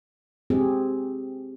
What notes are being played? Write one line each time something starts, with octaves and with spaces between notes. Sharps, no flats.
C4 G4 G#4